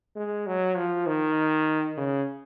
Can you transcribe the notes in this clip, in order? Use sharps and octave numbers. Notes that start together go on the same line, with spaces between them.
G#3
F#3
F3
D#3
C#3